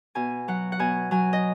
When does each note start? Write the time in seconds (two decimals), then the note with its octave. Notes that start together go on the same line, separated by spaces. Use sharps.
0.15 B2 G#5
0.48 F#3 F#5
0.72 F#5
0.79 B2 G#5
1.11 F#3 G#5
1.33 D#5